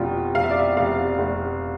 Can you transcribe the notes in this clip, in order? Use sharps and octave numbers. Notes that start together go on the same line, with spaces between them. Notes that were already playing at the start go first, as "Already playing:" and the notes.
Already playing: F1 B2 F4 G4
F1 F5
E5
D5
E5
F1 F5
F1